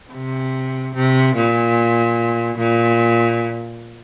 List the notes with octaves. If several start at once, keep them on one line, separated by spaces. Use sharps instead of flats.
C3
C3
A#2
A#2